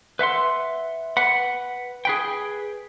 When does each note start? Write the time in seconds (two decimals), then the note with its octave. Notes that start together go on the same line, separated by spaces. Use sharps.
0.19 B4 E5 F#5 C6
1.17 B4 F#5
2.05 G#4 B4 G5